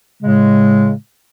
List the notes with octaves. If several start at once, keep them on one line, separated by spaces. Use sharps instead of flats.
A2 C#3 G#3